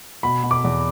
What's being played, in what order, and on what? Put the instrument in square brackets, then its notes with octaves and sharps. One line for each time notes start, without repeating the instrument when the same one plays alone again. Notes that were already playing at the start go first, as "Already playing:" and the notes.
[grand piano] B2 B5
B2
D6
E2